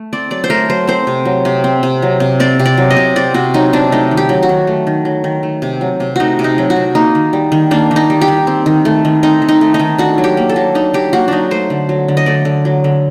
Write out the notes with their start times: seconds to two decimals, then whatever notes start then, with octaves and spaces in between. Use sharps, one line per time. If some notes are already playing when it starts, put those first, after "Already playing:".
Already playing: A3
0.13 C4 D5
0.31 F#3 D5
0.44 C5
0.50 A3 A#4
0.70 F#3 C5
0.87 C4 C5
1.07 C3
1.25 F#3
1.45 C3
1.64 C4
1.83 C3
2.02 F#3
2.20 C3
2.40 C4 D5
2.59 C3
2.66 D5
2.78 F#3
2.90 D#5
2.97 C3
3.16 C4 D5
3.34 C3 F#4
3.54 F#3 D#4
3.73 C3 D4
3.92 A3 D#4
4.11 D#3
4.17 G4
4.29 F#3
4.43 F#4
4.49 D#3
4.67 A3
4.87 D#3
5.05 F#3
5.24 D#3
5.43 A3
5.62 C3
5.81 F#3
6.00 C3
6.16 A3 D#4 F#4
6.39 C3
6.44 D#4
6.58 F#3
6.70 F#4
6.76 C3
6.95 A#3 D#4
7.15 D#3
7.33 G3
7.52 D#3
7.71 A#3 D4
7.91 D#3
7.96 D#4
8.10 G3
8.21 G4
8.28 D#3
8.47 C4
8.66 D#3
8.85 A3
9.05 D#3
9.23 C4 D#4
9.42 D#3
9.49 D#4
9.61 A3
9.74 D#4
9.79 D#3
9.98 D4 F#4
10.18 F#3
10.24 G4
10.37 A#3
10.49 A4
10.56 F#3
10.75 D4 D#4
10.94 F#3 G4
11.13 A#3 F#4
11.28 F#3 D4 D#4
11.51 A3 C5
11.70 D3
11.89 F#3
12.08 D3
12.17 D#5
12.26 A3 D5
12.45 D3
12.65 F#3
12.84 D3